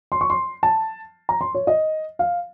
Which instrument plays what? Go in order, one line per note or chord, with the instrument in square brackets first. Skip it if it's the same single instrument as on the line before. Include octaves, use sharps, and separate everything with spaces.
[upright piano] C6
C#6
C6
A5
A#5
C6
C#5
D#5
F5